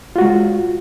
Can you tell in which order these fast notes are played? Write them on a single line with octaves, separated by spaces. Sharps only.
F4 F#4 G#3